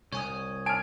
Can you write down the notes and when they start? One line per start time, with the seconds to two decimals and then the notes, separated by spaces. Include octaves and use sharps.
0.12 C2 C#5 G#5 D#6
0.66 G#5 A5 F6 D7